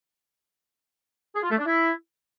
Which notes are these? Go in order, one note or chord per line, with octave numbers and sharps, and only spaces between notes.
G#4
F4
A3
D4
E4